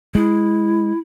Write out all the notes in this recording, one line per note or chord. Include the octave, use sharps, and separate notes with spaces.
G#3 E4